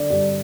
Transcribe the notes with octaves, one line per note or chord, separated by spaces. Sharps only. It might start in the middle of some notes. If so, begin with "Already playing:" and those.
Already playing: D3 D5
G2 D5